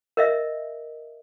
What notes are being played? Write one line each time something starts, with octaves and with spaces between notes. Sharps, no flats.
A#4 D#5 E5